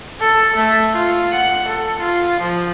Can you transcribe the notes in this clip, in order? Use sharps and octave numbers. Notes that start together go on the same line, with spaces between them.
A4
A3
F4
F#5
A4
F4
F3